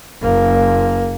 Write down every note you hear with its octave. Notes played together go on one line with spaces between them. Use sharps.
F#1 A#3